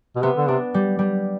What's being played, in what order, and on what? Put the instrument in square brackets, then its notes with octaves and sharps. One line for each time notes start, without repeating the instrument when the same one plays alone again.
[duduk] B2
[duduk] C3 [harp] B3
[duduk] D3
[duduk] C3 [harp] D4
[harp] G3
G3